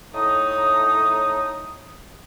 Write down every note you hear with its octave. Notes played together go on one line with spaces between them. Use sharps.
A2 D#4 D#6